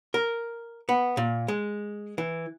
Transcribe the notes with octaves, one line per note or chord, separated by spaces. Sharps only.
A#4
B3
A#2
G#3
E3